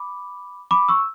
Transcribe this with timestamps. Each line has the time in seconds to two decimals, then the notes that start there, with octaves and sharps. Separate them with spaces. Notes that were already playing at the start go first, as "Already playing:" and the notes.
Already playing: B5 D6
0.71 B5 D6
0.89 C#6 E6